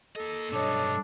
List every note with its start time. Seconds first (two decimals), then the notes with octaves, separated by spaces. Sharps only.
0.16 A#3 A4 D#5
0.53 B1 G2 D4 C#5 D#5